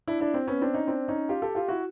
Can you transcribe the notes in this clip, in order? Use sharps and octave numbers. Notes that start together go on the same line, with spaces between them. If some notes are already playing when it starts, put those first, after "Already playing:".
D4 E4
D4 E4
C4
B3 C#4
C4 D4
C#4 D#4
C4 D4
C#4 D#4
F4 G4
G4 A4
F4 G4
E4 F#4